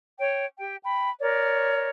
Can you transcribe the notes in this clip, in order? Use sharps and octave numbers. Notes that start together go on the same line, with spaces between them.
C#5 G5
G4 G5
G5 B5
A#4 C#5 D5